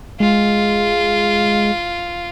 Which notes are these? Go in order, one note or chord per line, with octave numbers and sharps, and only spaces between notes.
G#3 F4